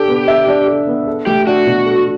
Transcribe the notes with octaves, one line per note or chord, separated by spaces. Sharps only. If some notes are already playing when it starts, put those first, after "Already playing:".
Already playing: D4 G4 A4
B3
E5
D4
A4
B3
A4
A3 G4
D4 F#4
B2
A4